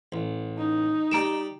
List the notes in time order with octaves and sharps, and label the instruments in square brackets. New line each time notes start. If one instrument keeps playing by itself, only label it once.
[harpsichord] A1
[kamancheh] D#4
[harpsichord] G3 G4 [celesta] A#5 D7 E7